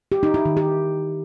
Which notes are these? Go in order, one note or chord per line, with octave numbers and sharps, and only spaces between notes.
G4
D#4
E4
D#3
G4